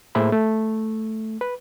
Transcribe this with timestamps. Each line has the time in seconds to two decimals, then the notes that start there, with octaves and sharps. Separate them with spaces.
0.15 A2 A#3 G#4 C5 E5 B5
0.32 A3
1.41 B4